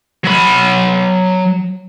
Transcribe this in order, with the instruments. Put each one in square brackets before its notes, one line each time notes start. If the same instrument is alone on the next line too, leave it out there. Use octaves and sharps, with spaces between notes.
[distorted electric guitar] F#3 B5